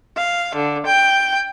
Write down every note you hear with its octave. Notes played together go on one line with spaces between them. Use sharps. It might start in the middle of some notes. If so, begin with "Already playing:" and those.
F5
D3
G5